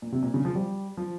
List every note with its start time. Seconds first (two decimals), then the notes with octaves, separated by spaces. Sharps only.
0.02 A#2
0.12 C3
0.23 A#2
0.34 C#3
0.45 F3
0.55 G3
0.97 F3